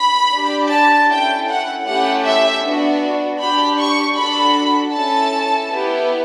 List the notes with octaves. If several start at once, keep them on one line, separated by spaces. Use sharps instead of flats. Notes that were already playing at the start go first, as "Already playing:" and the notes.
Already playing: B5
D4 G4
A5
C#4 E4 A4 G5
F#5
A3 C#4 E4 G4 F#5
E5
B3 D4 F#4
D4 G4 B5
C#6
D4 F#4 A4 B5
C#4 E4 A4 A5
B3 E4 G4